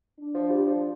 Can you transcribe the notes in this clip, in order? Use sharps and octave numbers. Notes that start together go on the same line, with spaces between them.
D4
F3
G3
F3